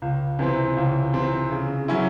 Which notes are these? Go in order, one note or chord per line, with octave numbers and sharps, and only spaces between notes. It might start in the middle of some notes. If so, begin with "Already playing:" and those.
C#2
C3 E3 C4
C#2
C3 E3 C4
C#3
F#3 C#4 E4